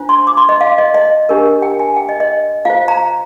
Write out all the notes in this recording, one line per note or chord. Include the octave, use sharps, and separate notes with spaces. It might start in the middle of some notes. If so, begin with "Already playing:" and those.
Already playing: D4 F4 C5
C6
D6
C6
D#5
F5
D#5
D#5
D4 G4 A#4
G5
G#5
G5
D#5
D#5
F4 C5 F5
A#5